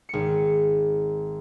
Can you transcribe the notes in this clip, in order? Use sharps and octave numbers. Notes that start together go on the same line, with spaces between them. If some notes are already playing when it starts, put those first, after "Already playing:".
G#1 C#7